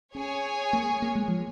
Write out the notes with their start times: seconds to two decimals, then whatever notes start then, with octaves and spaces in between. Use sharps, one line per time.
0.14 C#4 G#4 C#5 G#5
0.73 A#3
1.02 A#3
1.15 G#3
1.28 F3